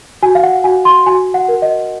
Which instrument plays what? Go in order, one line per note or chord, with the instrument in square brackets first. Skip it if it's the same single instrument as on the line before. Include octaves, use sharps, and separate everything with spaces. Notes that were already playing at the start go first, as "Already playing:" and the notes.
[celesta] F#4 G#5
F5
F#5
F#4 G#5
C6
F#4 G#5
F#5
A#4
D#5